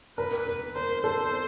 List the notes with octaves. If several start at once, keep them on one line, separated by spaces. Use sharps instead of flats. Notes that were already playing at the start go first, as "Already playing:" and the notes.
A#4 B4
A#4
A#4 C5
A4 C5